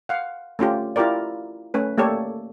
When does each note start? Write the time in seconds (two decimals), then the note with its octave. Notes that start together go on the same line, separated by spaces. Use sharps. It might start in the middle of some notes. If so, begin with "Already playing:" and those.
0.09 F5 F#5
0.59 A3 C#4 F4 G4
0.96 E4 F4 G4 A#4 D5
1.74 A3 C#4 B4
1.98 A3 A#3 G4 A4 C#5 D5